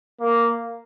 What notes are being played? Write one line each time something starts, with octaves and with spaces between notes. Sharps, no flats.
A#3